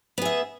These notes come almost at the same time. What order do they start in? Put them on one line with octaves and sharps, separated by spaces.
B3 G#4 E5